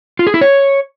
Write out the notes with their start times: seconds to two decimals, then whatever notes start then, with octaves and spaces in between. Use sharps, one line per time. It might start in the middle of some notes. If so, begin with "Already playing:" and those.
0.19 F4
0.27 G#4
0.34 E4
0.41 C#5